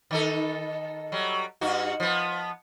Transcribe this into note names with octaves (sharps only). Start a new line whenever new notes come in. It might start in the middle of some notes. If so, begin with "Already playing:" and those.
D#3 D#4 A4
F#3 G3
G2 D#4 F#4
F3 B3